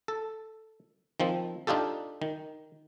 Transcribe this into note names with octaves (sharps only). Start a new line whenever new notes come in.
A4
D#3 F3 C4
D4 D#4 F4 G4 A4
D#3